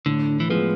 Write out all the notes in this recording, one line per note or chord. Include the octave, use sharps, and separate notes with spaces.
A2 D3
E3
F3 G#3 B3